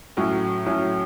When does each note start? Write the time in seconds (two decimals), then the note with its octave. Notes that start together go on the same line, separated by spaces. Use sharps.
0.17 A2 F#3 C#4
0.66 A2 F#3 C#4